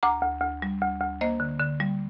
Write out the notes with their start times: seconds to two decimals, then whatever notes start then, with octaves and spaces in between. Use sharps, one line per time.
0.03 D2 A#5 D6
0.23 D2
0.42 D2
0.62 G3
0.82 D2
1.01 D2
1.21 A#3 C5 D#5
1.40 D3
1.60 D3
1.80 G3